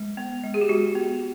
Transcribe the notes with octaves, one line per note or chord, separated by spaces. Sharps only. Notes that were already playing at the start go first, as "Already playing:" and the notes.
Already playing: G#3
B3
G#3
G#4
G4
G#3 F#4
B3